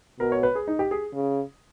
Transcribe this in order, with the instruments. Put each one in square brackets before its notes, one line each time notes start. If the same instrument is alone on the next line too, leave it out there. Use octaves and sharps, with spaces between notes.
[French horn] B2 [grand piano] A#4
[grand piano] C#5
B4
G#4
D#4
G4
G#4
[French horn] C#3